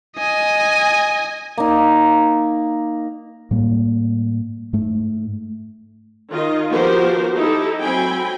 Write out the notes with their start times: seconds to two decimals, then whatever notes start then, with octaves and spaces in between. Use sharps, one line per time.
0.18 D#5 G#5
1.58 A#3 D#4
3.51 A2 G3 A#3
4.73 G#2 A3
6.30 D#3 F4 D#5
6.70 F3 B3 F#4 G4 A#4 C5
7.35 D#4 E4 G4 A4
7.81 F#3 C4 G5 G#5 B5